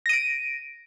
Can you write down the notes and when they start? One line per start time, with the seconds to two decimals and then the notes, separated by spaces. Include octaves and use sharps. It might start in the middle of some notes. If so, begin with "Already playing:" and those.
0.06 A#6
0.09 D#7
0.13 D7